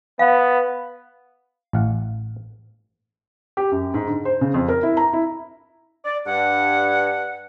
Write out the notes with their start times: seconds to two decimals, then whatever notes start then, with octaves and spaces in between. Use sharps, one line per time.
0.19 B3 F5
1.73 A1 F5 F#5
3.57 G4
3.71 F#2
3.94 G#2
4.07 D3
4.25 C5
4.41 C#3
4.54 F2
4.68 A#4
4.83 E4
4.97 A#5
5.13 E4
6.05 D5
6.27 G2 F#5